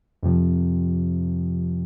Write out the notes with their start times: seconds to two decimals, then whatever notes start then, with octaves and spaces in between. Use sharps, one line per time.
0.23 F2 C3 F3